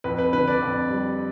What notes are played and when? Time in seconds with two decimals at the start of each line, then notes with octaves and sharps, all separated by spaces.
0.04 F2 B4
0.19 B4
0.33 D3 B4
0.47 B4 D5
0.62 F2
0.90 G3